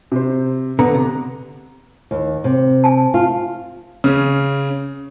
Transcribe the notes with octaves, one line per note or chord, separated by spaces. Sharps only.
C3 C5
D3 B3 A#5
C3
D#2
C3
G#5 A5
F4
C#3 C#4